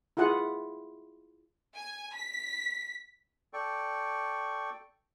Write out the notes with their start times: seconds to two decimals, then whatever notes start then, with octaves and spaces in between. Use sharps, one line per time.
0.17 E4 F4 G#4 F#5
1.75 G#5
2.14 B6
3.53 A4 D5 G5 C#6